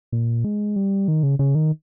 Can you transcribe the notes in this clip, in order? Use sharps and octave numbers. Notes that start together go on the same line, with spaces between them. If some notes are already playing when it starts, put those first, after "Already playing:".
A#2
G#3
G3
D#3
C#3
C#3
D#3